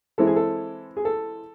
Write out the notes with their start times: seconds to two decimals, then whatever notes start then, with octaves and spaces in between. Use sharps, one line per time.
0.18 E3 G#3 C4 E4 A4
0.27 G#4
0.36 A4
0.97 G#4
1.05 A4